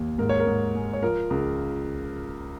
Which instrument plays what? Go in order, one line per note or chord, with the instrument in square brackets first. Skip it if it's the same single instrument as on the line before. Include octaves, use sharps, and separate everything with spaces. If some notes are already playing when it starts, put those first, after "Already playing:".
Already playing: [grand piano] D#2
G#2 A#4
C#5
A#4
G#2
G#3
C#5
F3 A#4
C#2